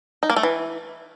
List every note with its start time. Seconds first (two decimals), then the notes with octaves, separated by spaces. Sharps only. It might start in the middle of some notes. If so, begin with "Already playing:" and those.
0.23 D#4
0.30 A#3
0.36 A3
0.43 E3